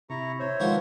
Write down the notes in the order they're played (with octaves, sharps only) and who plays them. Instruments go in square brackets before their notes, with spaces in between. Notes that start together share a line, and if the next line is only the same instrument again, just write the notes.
[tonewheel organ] C3 [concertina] E4 A#5 C#6
[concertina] C5 C#5 E5
[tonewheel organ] D#3 B4 [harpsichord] F3 A#3 F#4 [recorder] G#3